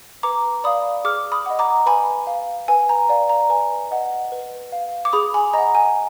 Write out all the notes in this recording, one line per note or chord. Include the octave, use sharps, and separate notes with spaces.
B4 A#5 D6
D5 F5 B5 D#6
G#4 D6 F6
B5 D#6
D#5 F#5
A#5 D6
B4 G#5 B5
F5
B4 G#5
A#5
D5 F5
A#5
B4 G#5
D#5 F#5
B4
F5
D6
G#4 B5 D#6
G#5 B5
D#5 F#5 A#5
G#5